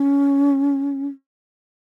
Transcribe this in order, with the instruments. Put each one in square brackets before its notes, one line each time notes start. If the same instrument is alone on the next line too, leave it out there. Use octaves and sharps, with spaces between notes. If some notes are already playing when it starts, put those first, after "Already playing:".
Already playing: [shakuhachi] C#4